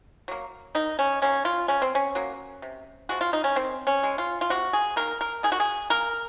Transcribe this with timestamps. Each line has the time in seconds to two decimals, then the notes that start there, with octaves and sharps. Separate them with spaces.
0.28 F#3 A#3
0.75 D#3 D#4
0.99 C#4
1.22 F#3 A#3 C#4
1.45 F4
1.68 C#3 C#4
1.82 C4
1.95 C#4
2.15 F#3 A#3
2.62 C3
3.09 F3 G#3 F#4
3.21 F4
3.33 D#4
3.44 C#4
3.55 D#3 C4
3.87 C#4
4.03 G#3
4.18 F4
4.41 F4
4.50 C3 F#4
4.73 G#4
4.96 D#3 A#3 A#4
5.21 A#4
5.43 D#3 G#4
5.52 F#4
5.60 G#4
5.90 A#3 A#4